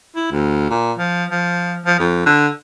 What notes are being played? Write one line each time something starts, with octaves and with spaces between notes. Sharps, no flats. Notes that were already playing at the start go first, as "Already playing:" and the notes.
E4
D2
A#2
F3
F3
F3
F2
D3